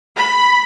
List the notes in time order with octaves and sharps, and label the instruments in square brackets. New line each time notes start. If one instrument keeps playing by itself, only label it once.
[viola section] B5